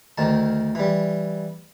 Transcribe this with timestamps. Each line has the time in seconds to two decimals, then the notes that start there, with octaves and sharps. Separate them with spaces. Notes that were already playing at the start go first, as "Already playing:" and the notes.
0.18 D2 D#3 A5
0.75 E3 G3